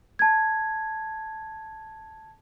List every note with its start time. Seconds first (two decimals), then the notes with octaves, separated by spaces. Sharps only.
0.19 A5 G#6